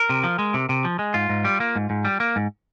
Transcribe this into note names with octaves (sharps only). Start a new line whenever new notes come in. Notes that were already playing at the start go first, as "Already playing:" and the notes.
Already playing: A#4
C3
F3
G#3
C3
C3
F3
G#3
G#2 F4
G#2
G3
A#3
G#2
G#2
G3
A#3
G#2